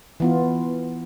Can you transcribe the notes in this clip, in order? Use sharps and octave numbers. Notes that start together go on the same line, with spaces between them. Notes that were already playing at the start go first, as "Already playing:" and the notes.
E3 B3 F4